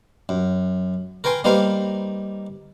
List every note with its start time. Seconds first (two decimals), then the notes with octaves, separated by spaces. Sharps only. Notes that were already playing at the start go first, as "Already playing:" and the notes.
0.29 F#2
1.24 A#4 B4 G5 G#5 C6
1.44 G3 A#3 D#4 B4 C5 F5